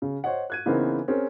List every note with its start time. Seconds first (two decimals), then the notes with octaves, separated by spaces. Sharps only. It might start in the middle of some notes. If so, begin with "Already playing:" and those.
0.02 C#3
0.24 C5 C#5 D#5 F#5
0.50 F#6 G#6 D#7
0.66 C#3 E3 B3 C4 D#4 A#4
1.08 C4 C#4 G#4 A#4